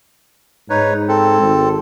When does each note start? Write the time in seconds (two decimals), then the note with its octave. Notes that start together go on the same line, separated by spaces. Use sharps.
0.70 G#2 D#4 B4 C#5
1.08 C4 A4
1.41 G#1